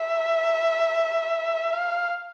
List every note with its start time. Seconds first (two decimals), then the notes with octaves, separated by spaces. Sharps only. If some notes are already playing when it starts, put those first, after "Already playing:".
Already playing: E5
1.72 F5